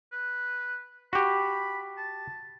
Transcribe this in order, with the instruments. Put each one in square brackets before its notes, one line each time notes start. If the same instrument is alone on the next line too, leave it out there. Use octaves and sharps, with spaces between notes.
[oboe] B4
[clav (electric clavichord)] F#4 G4 [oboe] B5
[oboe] A5